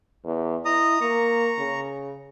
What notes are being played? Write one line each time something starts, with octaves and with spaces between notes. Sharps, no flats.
E2
E4 D#5 A#5 D#6
A#3 A#5 C#6
C#3